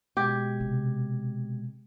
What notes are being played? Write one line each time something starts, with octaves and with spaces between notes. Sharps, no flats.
B2 G#3 G4 G#6
C3